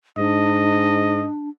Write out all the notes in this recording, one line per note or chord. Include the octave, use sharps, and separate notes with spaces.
G#2 D4 D#5